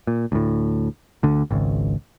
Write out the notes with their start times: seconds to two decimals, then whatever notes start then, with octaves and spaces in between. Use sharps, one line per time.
0.07 A#2
0.32 D2 A2
1.23 D2 D3
1.51 G#1 C#2